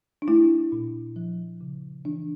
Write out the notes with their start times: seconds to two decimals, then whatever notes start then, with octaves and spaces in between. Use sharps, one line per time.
0.22 D4
0.28 A3 E4
0.72 A#2
1.16 F3
1.61 C#3
2.05 E3 D4